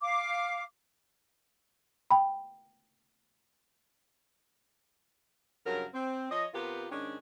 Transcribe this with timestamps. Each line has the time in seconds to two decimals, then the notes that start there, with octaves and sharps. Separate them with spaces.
0.01 F5 D6
2.10 G5 B5
5.66 G2 C#3 F#3 A#4
5.94 C4
6.31 F3 C#5 D#5
6.54 C3 B3 F4 G4 A#4
6.91 G#2 D#3 C#4 D4